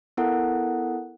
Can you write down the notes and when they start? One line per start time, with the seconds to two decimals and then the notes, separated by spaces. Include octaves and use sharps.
0.17 B3 E4 A4 A#4 F#5